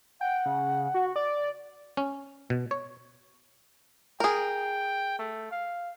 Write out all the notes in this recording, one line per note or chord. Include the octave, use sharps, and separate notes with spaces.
F#5 G5
C#3
F#4
D5
C#4
B2
C#5
G#4 A#4 G5
A3
F5